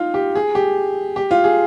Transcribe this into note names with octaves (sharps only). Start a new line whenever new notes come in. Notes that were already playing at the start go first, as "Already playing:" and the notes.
Already playing: D#4 F4
G4
G#4
G4
G4
F4
G#4